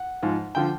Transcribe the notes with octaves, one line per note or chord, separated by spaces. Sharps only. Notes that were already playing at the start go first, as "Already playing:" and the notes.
Already playing: F#5
G#2 F3
D3 F3 G5